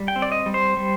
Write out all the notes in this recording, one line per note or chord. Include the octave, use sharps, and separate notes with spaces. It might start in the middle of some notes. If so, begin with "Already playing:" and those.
Already playing: G3
G5
C4
D5
D#5
G3
C5
G3